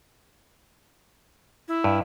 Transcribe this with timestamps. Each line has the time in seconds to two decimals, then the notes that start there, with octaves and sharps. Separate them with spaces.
1.68 E4
1.84 G2